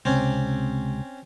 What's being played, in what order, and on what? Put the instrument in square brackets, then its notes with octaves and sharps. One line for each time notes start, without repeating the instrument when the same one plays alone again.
[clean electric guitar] C#2 C3 [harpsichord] C4 C#4